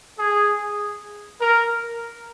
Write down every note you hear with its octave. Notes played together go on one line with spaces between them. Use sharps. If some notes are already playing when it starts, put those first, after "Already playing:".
G#4
A#4